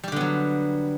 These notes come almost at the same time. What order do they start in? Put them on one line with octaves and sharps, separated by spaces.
G3 G4 D3 B3 F#3